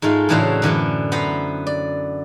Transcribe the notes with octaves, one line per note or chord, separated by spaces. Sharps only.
G#2 G#3 A3 F4
A2 C#3 E3 F#3 D4 C5
F#2 D3 E3 E4
B3 C5 A#5 B5
D5